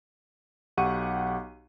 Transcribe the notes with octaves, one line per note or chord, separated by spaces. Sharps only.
B1 G4 F#5 C#6 D#7